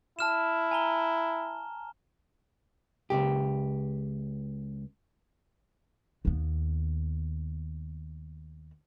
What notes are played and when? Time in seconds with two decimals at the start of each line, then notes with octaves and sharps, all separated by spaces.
0.19 E4 A5 F6 E7
0.71 G#5 A#5 G7
3.10 C#2 F#2 G4
6.25 D#2 B3